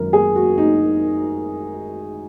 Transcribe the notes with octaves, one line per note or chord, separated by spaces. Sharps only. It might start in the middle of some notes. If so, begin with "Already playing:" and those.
Already playing: G#1 F#2 D#3 A#4
G#4
F#4
D#4